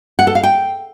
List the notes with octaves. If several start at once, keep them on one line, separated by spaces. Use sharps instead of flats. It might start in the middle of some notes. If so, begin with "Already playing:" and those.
F#5
A4
F5
G5